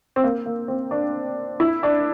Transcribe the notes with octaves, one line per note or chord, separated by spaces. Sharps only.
C4
A#3
A#3
C4
D4
E4
D4